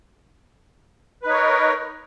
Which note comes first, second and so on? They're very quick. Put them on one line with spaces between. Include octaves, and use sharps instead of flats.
B4 D#4 C#5 A#4